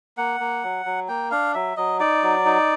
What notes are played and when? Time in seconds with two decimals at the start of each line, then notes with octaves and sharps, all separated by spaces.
0.17 A#3 F#5
0.40 A#3
0.63 F#3
0.85 F#3
1.08 A#3 G5
1.31 D4 F5
1.55 F#3 E5
1.77 F#3 D#5
2.00 D#4 D5
2.23 F#3
2.46 D#4